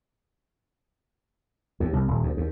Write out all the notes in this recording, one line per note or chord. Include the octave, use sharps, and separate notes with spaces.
D#2
C2
D#1
D2
D#2